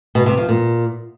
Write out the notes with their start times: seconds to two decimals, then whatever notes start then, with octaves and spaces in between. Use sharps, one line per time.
0.15 B2
0.26 C3
0.37 F3
0.49 A#2